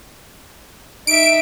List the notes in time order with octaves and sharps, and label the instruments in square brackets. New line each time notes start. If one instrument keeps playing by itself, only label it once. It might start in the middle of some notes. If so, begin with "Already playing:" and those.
[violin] D#4 E5 [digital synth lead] D7